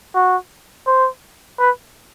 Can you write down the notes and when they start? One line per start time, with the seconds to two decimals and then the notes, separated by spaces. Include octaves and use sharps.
0.15 F#4
0.87 C5
1.59 B4